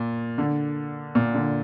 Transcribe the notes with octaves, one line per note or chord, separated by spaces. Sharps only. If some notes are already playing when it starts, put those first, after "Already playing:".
Already playing: A#2
D3
A#2
D3